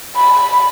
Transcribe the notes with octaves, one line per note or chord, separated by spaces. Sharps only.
B5